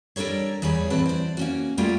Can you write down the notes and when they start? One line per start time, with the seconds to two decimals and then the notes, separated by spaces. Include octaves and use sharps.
0.16 G3 D4 A4 A#4 C#5
0.62 E2 G3 B3 G#4 C#5
0.90 A2 E3 C4 F#4 B4 A5
1.06 C5 D5
1.37 A#3 C#4 F#4
1.77 F#2 G3 A3 A#3 F4 G5